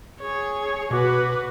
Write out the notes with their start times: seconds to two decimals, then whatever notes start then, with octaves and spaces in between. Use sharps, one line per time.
0.21 G#4 C#5
0.91 B2 F#4 B4 D6